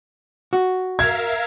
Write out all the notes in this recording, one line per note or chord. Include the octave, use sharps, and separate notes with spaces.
F#4
A#4 E5 F5 G#6